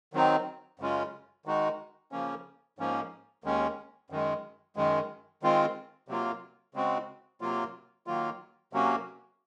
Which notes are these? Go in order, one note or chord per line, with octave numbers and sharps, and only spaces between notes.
D#3 F#3 C4 D#4
F#2 C#3 G#3 C#4 F4
D#3 G#3 D#4 F#4
C#3 F3 A#3 C#4
G#2 F3 A#3 C#4
D#2 D#3 G#3 C#4
F#2 D#3 G#3
F#2 D#3 G#3
D#3 G#3 C4 F4
C3 F#3 A#3 F4
C#3 G#3 C4 F#4
C3 F#3 A#3 F4
D#3 F#3 A#3 F4
C3 F#3 A#3 C#4 F#4